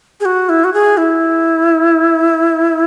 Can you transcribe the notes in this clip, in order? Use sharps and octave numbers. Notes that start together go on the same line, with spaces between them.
G#4
F#4
E4
F#4
G#4
E4